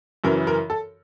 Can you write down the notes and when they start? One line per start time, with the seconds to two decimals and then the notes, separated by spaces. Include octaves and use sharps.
0.24 F#2 C#3 E3 A#4
0.47 A#4
0.70 A4